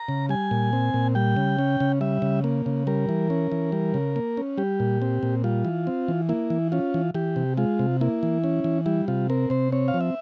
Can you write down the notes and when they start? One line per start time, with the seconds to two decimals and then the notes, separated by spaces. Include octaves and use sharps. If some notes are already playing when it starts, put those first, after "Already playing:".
Already playing: A#5
0.08 C#3
0.29 G3 G#5
0.51 A#2
0.73 C4
0.94 A#2
1.15 G3 G5
1.36 C#3
1.59 C#4
1.80 C#3
2.01 G3 E5
2.22 C#3
2.44 A#3
2.66 C#3
2.87 G3 A#4
3.09 E3
3.30 C#4
3.52 E3
3.72 G3
3.94 C#3
4.16 A#3
4.37 C#4
4.58 G3 G4
4.80 A#2
5.02 C4
5.23 A#2
5.44 G3 F4
5.65 E3
5.87 C4
6.08 E3
6.29 A#3 E4
6.50 E3
6.72 C#4 F4
6.94 E3
7.14 E3 G4
7.36 C3
7.57 G#3 F4
7.79 C3
8.01 A#3 E4
8.23 E3
8.44 C#4
8.64 E3
8.86 G3 E4
9.08 C3 F4
9.30 C4 A#4
9.50 C3 C5
9.72 C4 C#5
9.88 F5
9.94 F3
10.01 E5